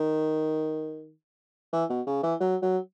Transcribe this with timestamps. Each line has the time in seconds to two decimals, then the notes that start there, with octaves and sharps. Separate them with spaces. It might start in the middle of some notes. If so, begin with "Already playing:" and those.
Already playing: D#3
1.73 E3
1.90 B2
2.07 C#3
2.23 E3
2.41 F#3
2.62 F#3